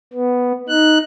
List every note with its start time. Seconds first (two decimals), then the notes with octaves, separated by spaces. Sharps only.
0.14 B3
0.69 D#4 F#6